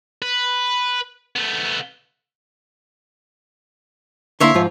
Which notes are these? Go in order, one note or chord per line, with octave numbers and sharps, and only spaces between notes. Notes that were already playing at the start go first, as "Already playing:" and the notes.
B4
A3 B3
D3 A#3 E4 C#5 E5 C6
G#2 F3 F4